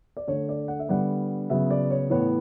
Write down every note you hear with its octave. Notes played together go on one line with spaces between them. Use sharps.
D5
D3 A3 C#5
D5
F#5
E5
D3 G3 B3 F#5
C#3 F#3 B3 E5
D5
C#5
A2 E3 B3 C#5